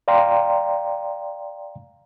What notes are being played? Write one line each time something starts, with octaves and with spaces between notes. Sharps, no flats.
D5 F5 G5 A#5 C6